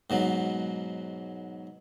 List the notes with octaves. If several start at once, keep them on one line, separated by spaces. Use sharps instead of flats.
G#2 B2 F#3